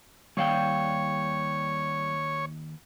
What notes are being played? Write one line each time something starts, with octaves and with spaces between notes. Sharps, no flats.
D#2 G3 C#5 F5 G5